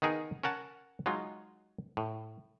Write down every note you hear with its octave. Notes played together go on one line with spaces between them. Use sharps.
D#3 B3 D#4 G#4 A#4
C#4 A#4 F#5 A5
F#3 G#3 D#4 F4
A2